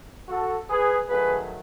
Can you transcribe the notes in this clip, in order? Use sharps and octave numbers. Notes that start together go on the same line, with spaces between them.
F#4 A4
G#4 B4
D#3 F#3 A3 G#4 B4